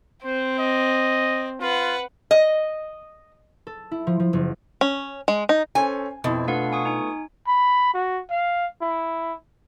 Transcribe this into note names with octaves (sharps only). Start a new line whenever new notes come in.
C4 C5
D#5
F4 B4 F#5
D#5
A4
E4
F3
F3
F#1
C#4
G#3
D#4
C#4 A4 C5 G#5
F2 B2 C4 E4
A3 B3 D4 F4 F5 F#5
G#5 C#6 D#6
D#4 G#5
B5
F#4
F5
E4